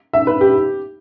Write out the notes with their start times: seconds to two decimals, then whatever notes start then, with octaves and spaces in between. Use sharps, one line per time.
0.13 E5
0.27 B4
0.41 G4